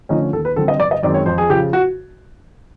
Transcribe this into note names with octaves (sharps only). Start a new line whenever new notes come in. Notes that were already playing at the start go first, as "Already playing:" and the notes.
D3 F3 A3 C#4 D#4
D#2 A4
B4
D3 G3 C4 A4
D#5
G1 D5
D#5
F#2 D#3 G#3 C4 D5
C#5
F2 C5
G#4
C#3 F3 G4
F#4